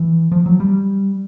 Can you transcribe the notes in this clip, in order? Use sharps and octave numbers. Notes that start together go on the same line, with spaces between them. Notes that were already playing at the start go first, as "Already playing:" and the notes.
Already playing: E3
F3
F#3
G3